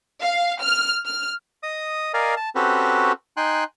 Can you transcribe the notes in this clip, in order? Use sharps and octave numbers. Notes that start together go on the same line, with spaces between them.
F5
F6
F6
D#5 D#6
A#4 D5 D#5 F5 G#5
A5
C4 C#4 F#4 G4 A4 B4
D#4 G5 G#5 C6 F#6